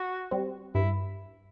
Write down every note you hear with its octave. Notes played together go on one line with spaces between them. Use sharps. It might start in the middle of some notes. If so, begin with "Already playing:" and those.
Already playing: F#4
G3 C4
G2 E4